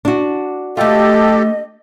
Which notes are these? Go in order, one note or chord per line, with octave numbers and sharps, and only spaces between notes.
D4 F#4
A3 F4 G4 A4 D#5